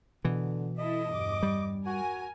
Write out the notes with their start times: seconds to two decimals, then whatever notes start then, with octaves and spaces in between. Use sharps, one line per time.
0.25 B2 D3 E3
0.78 E4 A4 D#5
1.12 E2 G2 D6
1.43 G3
1.87 F#4 A#4 G#5